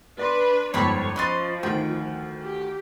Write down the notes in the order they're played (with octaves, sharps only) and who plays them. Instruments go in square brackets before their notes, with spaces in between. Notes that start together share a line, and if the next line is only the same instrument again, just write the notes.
[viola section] D4 B4 [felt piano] D5 C6
[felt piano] G1 F2 G#2 [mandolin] C4 A5 B5 [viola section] C#5
[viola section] F3 [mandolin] C#4 D#5 C6 [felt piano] B5 F#6 A6
[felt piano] D2 D#3 [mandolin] G5
[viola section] G4